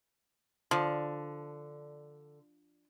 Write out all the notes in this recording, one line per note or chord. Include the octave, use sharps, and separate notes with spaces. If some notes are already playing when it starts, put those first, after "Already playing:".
D3 F3